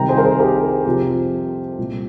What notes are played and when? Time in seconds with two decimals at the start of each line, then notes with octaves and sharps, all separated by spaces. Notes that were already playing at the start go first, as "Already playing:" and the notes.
Already playing: C2 C3 D#3 G5 A#5
0.09 G#4 C5
0.18 A#4
0.24 G#4 C5
0.40 G4 A#4
0.86 F2 C3 F3 G4
1.78 C2 A#2 F3